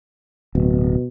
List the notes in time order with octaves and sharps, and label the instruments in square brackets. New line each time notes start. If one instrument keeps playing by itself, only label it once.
[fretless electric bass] D1 [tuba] B2